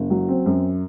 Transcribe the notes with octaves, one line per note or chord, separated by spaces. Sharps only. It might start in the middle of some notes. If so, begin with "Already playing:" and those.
Already playing: F#1
F#3
C4
F#2